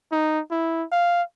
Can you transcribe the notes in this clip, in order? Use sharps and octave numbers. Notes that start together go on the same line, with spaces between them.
D#4
E4
F5